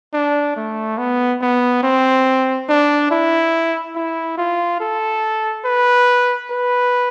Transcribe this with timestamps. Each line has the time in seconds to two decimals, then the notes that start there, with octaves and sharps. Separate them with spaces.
0.13 D4
0.56 A3
0.98 B3
1.41 B3
1.83 C4
2.69 D4
3.11 E4
3.95 E4
4.37 F4
4.80 A4
5.65 B4
6.50 B4